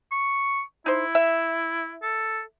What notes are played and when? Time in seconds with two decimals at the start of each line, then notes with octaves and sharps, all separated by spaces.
0.12 C#6
0.86 D#4 E4 C5
1.15 E5
2.03 A4